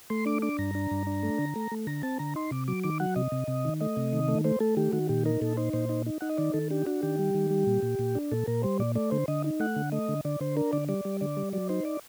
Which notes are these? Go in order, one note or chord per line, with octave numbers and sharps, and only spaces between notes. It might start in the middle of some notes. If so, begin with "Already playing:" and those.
A3 C6
D4 D6
D4 D6
G2 A#5
D4
G2
D4
A3
D3
A3
A3
D3 A#5
C4 A5
D3 A#5
D#4 C6
C3 D6
F#3 D6
D#3 D6
F#3 F#5
C3 D#5
C3
C3
D#3
A3 D#5
C3
D#3
A3
A3 C5
A3 A4
D#3 G4
D#3 F#4
A#2 G4
D#4 A#4
A#2 A4
D#4 C5
A#2 C5
D#4
D#4
D#4 F#5
D#5
D#3 D5
D#3 A4
D4 G4
D4 F#4
D#3 G4
G3
D#3
G3
A#2
A#2
A#2
D4
A#2 A4
A#2 A#4
G3 C5
A#2 D5
A3 D5
D3 C5
D3 D#5
D#4
A3 F#5
D3
A3 D#5
D3
D3 D5
D3 C5
D4 A#4
D3 D5
G3 D5
G3
D3 D5
G3
F#3 D5
D#4 C5
D5